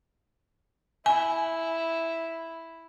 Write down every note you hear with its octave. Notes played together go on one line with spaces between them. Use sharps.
E4 G#5